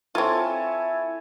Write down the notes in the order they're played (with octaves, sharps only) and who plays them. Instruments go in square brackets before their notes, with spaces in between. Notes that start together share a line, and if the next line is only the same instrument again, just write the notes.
[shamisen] C4 F4 [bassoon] E4 [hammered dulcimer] A4 C#5 G#5